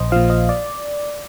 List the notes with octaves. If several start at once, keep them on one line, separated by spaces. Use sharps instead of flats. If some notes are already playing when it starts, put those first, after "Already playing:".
Already playing: A#1 C5 D#5
A#2 F3 F5
D#5
D5